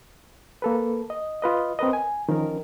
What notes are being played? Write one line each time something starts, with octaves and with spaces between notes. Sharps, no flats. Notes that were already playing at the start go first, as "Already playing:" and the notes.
A#3 A4 B4
D#5
F4 B4 D#5
C4 A#4 B4 D#5
G#5
D#3 F3 C#4 A#4